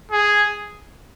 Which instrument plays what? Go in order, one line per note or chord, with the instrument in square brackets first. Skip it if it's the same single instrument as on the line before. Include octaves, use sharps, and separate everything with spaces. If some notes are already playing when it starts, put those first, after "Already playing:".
[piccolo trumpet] G#4